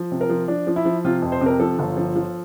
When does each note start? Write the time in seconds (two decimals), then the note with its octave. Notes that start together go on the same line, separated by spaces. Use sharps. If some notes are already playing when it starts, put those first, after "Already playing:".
Already playing: F3
0.12 C3
0.21 A#4
0.30 F3
0.48 F3 D4
0.67 F3
0.76 E4
0.85 F3
1.05 C3 F4
1.22 F2
1.32 C5
1.41 C3
1.46 A#4
1.60 F3 A4
1.79 G1
1.97 F3
2.15 F3